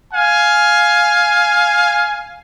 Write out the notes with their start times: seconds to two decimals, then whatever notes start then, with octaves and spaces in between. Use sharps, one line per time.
0.13 F5 G#5